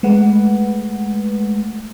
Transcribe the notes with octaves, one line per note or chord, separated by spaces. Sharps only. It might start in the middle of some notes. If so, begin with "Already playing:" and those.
G#3 A3 B4 F#5